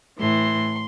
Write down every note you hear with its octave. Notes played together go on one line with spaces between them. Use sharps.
A2 E3 C6